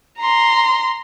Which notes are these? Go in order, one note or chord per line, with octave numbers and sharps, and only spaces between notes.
A#5 C6